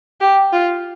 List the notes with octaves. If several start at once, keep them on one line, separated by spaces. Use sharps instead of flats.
G4
F4